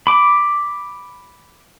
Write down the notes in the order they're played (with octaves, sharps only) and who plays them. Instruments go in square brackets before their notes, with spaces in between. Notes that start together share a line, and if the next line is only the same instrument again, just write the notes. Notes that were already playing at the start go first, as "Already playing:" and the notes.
[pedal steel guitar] B5 D6